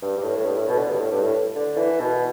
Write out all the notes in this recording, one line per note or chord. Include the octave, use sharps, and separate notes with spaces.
G2
G2
A2
A2
G2
A2
B2
D3
G2
A2
G2
A2
D3
E3
B2